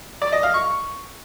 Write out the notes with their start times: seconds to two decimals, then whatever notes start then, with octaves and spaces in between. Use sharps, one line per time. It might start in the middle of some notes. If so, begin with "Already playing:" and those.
0.22 D5
0.32 D#5
0.43 F5
0.54 C#6